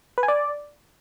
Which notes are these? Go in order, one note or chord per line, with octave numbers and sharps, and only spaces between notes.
B4
G#5
D5